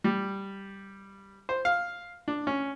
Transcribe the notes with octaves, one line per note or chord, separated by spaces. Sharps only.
G3
C5
F5
D4
C#4